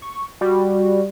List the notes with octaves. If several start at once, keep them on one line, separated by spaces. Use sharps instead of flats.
C#6
G3 F#4